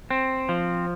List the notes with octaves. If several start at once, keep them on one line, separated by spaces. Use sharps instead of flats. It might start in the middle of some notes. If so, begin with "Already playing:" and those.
C4
F3